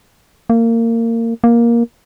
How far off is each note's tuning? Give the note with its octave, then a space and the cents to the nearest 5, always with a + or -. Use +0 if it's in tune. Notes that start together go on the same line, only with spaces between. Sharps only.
A#3 -25
A#3 +10